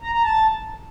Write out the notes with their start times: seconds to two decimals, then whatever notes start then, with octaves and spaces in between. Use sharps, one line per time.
0.02 A#5
0.13 A#5
0.23 A5